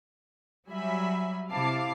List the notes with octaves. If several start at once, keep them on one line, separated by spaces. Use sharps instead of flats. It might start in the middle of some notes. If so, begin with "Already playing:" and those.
F#3 G3 E5 G#5 B5
C3 E4 F5 A5 D6 C7